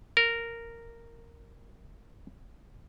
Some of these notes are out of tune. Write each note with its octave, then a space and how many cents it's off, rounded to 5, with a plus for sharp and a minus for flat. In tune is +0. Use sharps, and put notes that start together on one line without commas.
A#4 -10